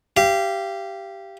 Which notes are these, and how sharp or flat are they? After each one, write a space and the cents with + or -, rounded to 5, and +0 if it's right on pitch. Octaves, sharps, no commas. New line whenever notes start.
G4 -5 F5 -35